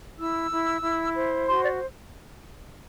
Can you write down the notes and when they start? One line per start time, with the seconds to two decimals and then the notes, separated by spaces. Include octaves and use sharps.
0.19 E4 E6
0.51 E4
0.82 E4
1.15 C5
1.46 F#4 C6
1.63 D5